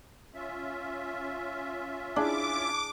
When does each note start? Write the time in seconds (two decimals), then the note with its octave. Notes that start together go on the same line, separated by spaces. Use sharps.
0.34 C#4 F4 E5
2.16 D4 E4 G#4 D6